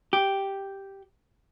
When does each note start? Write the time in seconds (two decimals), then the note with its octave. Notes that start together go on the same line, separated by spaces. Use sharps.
0.13 G4